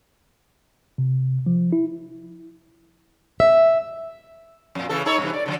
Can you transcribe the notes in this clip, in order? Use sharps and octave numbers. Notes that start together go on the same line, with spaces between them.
C3
F3
E4
E5
F2 A#2
C#3 E3 A4
D#4 A4 C#5
G2 C3 E3
D5
D3 D#3 F3